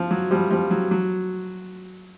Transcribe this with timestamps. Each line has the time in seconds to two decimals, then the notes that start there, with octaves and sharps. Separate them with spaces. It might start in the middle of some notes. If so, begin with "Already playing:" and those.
Already playing: F3
0.11 F#3
0.31 F3 G3
0.50 F3 G3
0.71 F#3
0.91 F#3